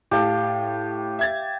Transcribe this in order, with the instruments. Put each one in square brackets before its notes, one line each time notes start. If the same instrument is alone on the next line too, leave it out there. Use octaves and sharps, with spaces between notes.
[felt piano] A2 A5 [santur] G4 F5
[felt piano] E5 G#6 A6